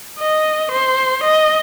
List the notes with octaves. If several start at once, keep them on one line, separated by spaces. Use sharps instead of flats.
D#5
C5
D#5